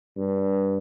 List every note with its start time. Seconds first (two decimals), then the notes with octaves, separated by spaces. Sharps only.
0.17 G2